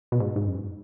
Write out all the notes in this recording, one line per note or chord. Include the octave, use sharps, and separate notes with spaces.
B2
G#2
G#2
F#2